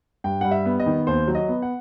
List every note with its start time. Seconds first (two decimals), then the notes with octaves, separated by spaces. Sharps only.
0.24 G2 G5
0.41 G3 F#5
0.51 E5
0.65 B3
0.80 D#5
0.86 D#3
1.07 D#2 C5
1.28 F#3
1.35 D#5
1.48 B3
1.62 F#5